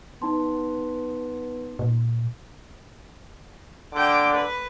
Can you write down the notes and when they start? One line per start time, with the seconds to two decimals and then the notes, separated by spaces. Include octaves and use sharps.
0.22 B3 D#4 A5 C6
1.79 A#2
3.94 D3 G5 D6
4.35 B4